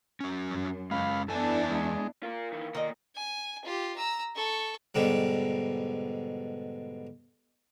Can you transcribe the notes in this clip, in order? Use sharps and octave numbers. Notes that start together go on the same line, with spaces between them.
F#3 C#4
F#2
G#3 C#4 F5 B5
E2 B3 D4 E4 A4 G#5
G#3
A#3 F4 A#4
D#3 E3
A#2 D#3 A#4 D#5
G#5
F4 G4
A#5 E6
A4 C#6
G#2 B2 D3 G3